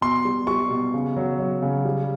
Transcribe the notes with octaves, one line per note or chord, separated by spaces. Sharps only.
B2 C6
G3
G3 C#6
B2
C#3
F#3
F#3
C#3
G3